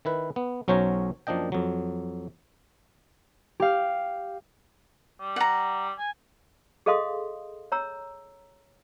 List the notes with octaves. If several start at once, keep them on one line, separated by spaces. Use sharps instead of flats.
D#3 E4 B4
B3
B1 F#3 C#4 C5 C#5 A#5
F#2 F3 A#3 D4 D#5 G5
F2 F#3
G4 F5
G3
F#5 A#5
G#5
G#4 A4 D#5 F5 C6 D#6
C#5 A#5 E6